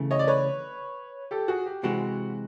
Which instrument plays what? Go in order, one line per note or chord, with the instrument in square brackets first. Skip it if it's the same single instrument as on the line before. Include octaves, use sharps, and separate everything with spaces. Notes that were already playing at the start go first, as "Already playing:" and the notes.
Already playing: [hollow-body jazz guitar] C#3 E3 A3
[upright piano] C#5 D#5
D5
B4 C#5
G4 A4
F#4 G#4
G4
[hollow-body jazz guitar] C3 E3 G#3 C4 [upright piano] F#4